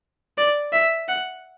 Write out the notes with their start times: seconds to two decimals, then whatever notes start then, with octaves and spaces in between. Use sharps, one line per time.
0.38 D5
0.73 E5
1.08 F#5